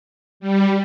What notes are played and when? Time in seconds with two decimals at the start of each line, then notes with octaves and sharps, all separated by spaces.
0.40 G3